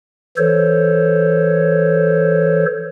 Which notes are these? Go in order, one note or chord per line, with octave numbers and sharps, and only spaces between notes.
E3 A4 C5 C#5